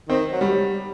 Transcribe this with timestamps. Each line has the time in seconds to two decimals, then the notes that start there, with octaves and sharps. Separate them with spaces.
0.09 D#3 C4
0.32 F#3
0.41 G3